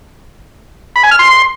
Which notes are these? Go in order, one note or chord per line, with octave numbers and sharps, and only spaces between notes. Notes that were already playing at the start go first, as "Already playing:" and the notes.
B5
G#5
F6
C6